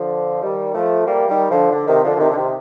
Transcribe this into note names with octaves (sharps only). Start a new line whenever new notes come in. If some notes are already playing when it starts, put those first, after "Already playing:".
Already playing: D3 F3
D#3 G3
F3 A3
G3 A#3
D#3 G3
D3 F3
D3
C3 D#3
D3 F3
D3
C3 D#3
D3
C3 D#3